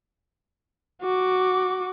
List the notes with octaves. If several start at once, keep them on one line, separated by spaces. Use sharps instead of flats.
F#4 D6